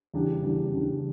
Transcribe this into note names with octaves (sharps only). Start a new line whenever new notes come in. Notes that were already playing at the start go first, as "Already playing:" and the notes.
E2 C#3 G3 D4 G4
E2 C#3 G3 D4 G4
E2 C#3 G3 D4 G4